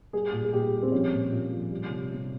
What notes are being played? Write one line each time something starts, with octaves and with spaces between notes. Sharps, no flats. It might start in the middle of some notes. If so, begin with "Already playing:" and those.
G3 G#4
A#2
G#4
A#2 G4
G3
C4
F3 C#4
A#2
A#2
F3
G3
C3
C3